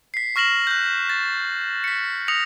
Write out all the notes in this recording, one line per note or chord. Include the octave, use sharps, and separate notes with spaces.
B6 C7
C#6 F6 A#6 E7 F#7
F#6 G6
A6
B6 C#7
D#6 A#6 C#7 F7